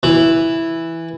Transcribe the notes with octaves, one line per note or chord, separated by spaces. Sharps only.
E3